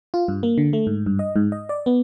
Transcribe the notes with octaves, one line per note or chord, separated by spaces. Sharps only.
F4
G2
A#3
D3
A3
G#2
G2
D#5
G#2
D#5
D5
B3